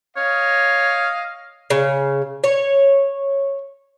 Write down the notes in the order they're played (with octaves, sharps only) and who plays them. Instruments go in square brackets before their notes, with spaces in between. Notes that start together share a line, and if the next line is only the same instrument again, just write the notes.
[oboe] C#5 [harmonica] D#5 F5
[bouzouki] C#3
C#5